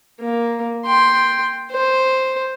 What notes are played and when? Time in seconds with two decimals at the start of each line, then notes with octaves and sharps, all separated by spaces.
0.20 A#3
0.86 G5 C6
1.71 C5